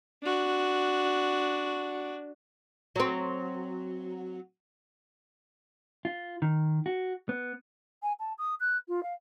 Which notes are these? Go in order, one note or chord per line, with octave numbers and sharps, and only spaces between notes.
D4 F#4
F#3 C4
F4
D#3
F#4
B3
G#5
A5
D#6
F#6
F4
F5